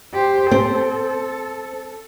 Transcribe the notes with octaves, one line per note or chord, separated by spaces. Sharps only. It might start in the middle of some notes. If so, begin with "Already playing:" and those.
G4 C5
C4 A4